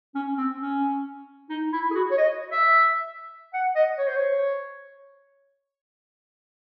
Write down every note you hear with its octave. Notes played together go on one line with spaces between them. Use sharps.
C#4
C4
C#4
D#4
E4
G#4
F#4
C#5
D#5
E5
F#5
D#5
C#5
C5
C#5